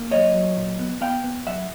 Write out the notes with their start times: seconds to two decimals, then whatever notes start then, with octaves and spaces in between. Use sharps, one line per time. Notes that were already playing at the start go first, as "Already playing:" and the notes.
Already playing: A#3
0.11 F#2 C#5 D#5
0.34 F#3
0.57 A#2
0.79 B3
1.01 B3 F5 G5
1.24 B3
1.46 F#2 E5 F#5